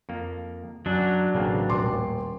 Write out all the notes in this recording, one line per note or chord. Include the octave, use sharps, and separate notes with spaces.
F2 A#3
F#2 F#3 D4
A1 C#3 A#3 C4
D#1 C6 D6